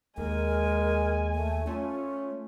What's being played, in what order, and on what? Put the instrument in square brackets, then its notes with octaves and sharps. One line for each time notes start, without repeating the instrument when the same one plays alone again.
[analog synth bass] D#2 [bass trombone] G#3 [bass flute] A#4 [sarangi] G#5
[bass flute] A3
[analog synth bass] A3 [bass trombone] C#4 [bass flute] F4